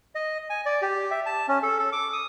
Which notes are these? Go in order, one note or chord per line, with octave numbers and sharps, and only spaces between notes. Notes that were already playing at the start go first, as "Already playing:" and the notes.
D#5
G#5
D5
G4
E5
A5
C#4
A4
A4
D6
D#6